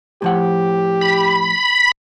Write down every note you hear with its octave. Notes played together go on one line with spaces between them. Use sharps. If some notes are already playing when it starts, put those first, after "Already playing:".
A2 F3 G4 F#5
B5